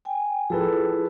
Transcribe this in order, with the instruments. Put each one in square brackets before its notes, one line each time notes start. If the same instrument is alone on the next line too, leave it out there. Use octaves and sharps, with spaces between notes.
[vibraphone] G5 G#5
[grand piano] F3 A4 B4 [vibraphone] E4 G#4